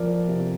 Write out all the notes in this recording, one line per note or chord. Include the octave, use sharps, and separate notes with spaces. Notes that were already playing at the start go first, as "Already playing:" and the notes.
Already playing: F2 F3 A#4 D5
C3